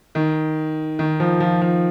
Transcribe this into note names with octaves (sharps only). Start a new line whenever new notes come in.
D#3
D#3
F3
F3
F3